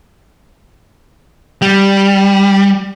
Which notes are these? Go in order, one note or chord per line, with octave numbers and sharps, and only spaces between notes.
G3